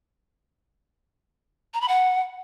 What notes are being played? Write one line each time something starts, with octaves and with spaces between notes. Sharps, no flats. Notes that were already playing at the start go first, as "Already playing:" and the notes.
A#5
B5
F#5